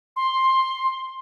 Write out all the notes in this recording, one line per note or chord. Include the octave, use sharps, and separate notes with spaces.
C6